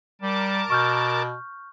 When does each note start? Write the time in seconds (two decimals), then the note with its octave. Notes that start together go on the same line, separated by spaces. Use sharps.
0.22 G3 A#4 A5 D6
0.70 B2 C#6 F6 G6